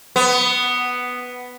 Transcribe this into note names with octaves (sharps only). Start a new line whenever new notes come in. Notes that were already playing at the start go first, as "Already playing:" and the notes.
B3